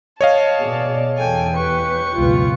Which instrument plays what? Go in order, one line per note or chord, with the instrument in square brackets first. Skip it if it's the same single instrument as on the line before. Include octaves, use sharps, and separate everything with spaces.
[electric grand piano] C#5 D#5 F5 [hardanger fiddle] A5
[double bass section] B2 [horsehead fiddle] G#4 D5
[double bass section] E2 [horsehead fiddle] A4 G5 [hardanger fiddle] G#5
[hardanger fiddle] G4 C#6 [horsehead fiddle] B4
[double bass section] C#2 F#2 B2 [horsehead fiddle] F4 B4